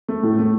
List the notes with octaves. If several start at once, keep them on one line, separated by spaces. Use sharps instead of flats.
A3
A2
A3